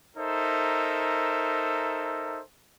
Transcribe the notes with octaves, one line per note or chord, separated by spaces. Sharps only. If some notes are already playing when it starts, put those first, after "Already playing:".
D#4 A4 A#4 C5 E5